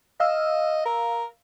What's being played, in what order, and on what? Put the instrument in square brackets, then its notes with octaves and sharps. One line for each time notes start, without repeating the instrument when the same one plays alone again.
[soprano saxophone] D#5 [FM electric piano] F5 E6
[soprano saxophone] A#4